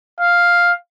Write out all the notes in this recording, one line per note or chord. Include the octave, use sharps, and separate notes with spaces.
F5